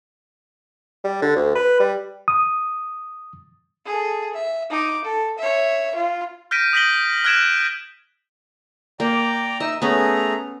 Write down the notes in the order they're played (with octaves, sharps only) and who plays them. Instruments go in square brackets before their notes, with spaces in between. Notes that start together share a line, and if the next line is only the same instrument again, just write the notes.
[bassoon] G3
D3
D2
B4
G3
[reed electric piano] D#6
[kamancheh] G#4 A4
E5
D#4 D6
A4
C#5 E5
F4
[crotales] F6 G6 A#6 B6 D7 D#7
D#6 G6 A#6 B6 F#7 G7
F6 F#6 G#6 D7 E7
[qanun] A#3 [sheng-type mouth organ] D5 G5 A#5
[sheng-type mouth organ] D#4 E5 E6 [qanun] D#5
[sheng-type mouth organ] A3 G#4 A#5 [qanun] B3 C#4